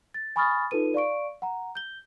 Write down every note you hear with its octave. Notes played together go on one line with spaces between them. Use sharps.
A6
G#5 B5 C#6 D#6 F6 A6
D#4 F4 A4 B4 D#7
D5 F5 C#6 D7
F#5 A#5
G6 G7